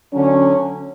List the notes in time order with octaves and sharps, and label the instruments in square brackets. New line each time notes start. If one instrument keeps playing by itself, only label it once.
[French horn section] D2 D3 F#3 C#4